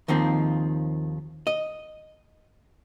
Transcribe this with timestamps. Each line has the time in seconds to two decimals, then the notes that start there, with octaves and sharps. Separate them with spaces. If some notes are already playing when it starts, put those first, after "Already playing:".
0.08 D#2 D#3 F3 C4
1.47 D#5